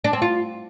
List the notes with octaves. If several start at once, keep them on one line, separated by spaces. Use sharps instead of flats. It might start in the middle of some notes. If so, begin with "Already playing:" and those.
D4
C4
F4